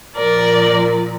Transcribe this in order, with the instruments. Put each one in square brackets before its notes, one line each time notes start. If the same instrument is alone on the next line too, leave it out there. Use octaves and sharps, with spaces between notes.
[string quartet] A#2 F3 A#4 D5